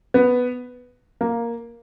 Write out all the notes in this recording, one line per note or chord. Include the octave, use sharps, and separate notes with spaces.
B3
A#3